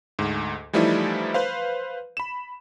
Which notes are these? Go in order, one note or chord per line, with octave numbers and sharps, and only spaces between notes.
D2 G#2
E3 F3 G3 A3 D#4 E4
B4 C5 F5
B5 E7